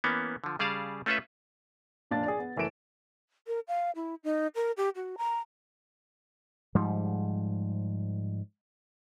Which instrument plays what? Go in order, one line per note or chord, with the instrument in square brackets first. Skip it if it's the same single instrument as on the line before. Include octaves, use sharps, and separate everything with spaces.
[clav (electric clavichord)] E3 A#3 B3 C#4
D3 F3
C#3 G3 G#4 D5 F5 A5
A3 C#4 F4 A4 B4 E5
[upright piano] F1 A#2 D4 F4 A6
G#4 D5
B3
F#1 E3 A3 D7 E7
[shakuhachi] A#4
F5
E4
D#4
A#4
G4
F#4
A#5
[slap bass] G#2 F3 G3